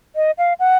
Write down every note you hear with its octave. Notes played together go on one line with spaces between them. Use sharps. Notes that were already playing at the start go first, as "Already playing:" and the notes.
D#5
F5
F#5